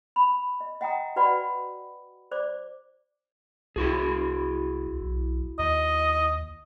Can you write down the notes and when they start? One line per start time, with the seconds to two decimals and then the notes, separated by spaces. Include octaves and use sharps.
0.16 B5
0.61 D#5
0.81 D#5 F#5 G5 A#5 D#6
1.16 F#4 B4 D5 F#5 B5
2.31 C5 D5 D6
3.76 C2 E4 F#4 G#4
5.01 B1
5.59 D#2 D#5